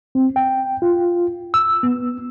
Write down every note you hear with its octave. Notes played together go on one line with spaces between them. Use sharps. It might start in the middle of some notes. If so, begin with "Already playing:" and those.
C4
G5
F4
E6
B3